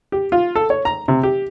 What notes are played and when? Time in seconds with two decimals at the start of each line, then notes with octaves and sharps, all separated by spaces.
0.12 G4
0.32 F4
0.55 A4
0.70 C#5
0.85 A#5
1.08 C3
1.23 G4